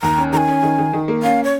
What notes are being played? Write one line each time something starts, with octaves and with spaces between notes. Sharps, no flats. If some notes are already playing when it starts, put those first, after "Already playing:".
D#2 A#5
C#4
D#3 G#5 A#5
C#4
D#3
D#3
D#3
A#3
C#4 F5
C#5